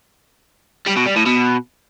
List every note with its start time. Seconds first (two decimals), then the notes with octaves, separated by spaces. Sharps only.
0.87 G3
0.97 B2
1.07 G3
1.17 A2
1.26 B2